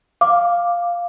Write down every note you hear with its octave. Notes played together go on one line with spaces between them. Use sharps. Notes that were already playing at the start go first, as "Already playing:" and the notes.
F5 D6